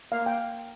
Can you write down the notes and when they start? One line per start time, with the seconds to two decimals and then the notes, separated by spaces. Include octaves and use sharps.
0.12 A#3 F5
0.26 G5